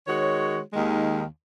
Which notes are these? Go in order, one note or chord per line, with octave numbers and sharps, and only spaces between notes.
D#3 G#3 F#4 C#5
D#2 D#3 G#3